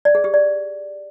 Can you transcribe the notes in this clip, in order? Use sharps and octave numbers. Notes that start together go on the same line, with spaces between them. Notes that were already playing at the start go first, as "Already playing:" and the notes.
D5
G#4
G4
D5